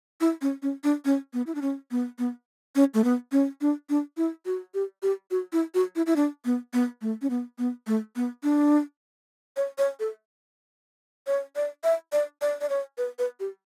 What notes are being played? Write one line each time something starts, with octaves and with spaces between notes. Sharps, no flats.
E4
C#4
C#4
D4
C#4
B3
E4
D4
C#4
B3
B3
C#4
A3
B3
C#4
D4
D4
E4
F#4
G4
G4
F#4
E4
F#4
E4
E4
D4
B3
B3
A3
C#4
B3
B3
A3
B3
D4
C#5
C#5
A4
C#5
D5
E5
D5
D5
D5
C#5
B4
B4
G4